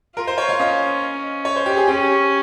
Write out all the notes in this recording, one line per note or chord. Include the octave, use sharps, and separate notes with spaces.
F4 A#4
C5
C#5
F5
C#4 D#5
C#5
C5
G4
G#4
C#4 G4